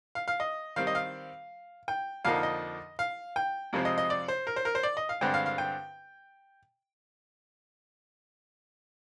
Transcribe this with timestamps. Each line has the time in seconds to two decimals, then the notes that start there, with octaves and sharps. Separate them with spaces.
0.15 F5
0.28 F5
0.40 D#5
0.76 D#3 G3 C4 F5
0.87 D#5
0.95 F5
1.88 G5
2.25 F2 D3 F3 A#3 D#4 F5
2.43 D#5
2.99 F5
3.36 G5
3.73 F2 C3 F3 G#3 C4
3.85 D#5
3.98 D#5
4.10 D5
4.28 C5
4.47 A#4
4.56 C5
4.65 A#4
4.75 C5
4.83 D5
4.97 D#5
5.09 F5
5.21 G2 D3 G#3 C4 G5
5.34 F5
5.46 F5
5.58 G5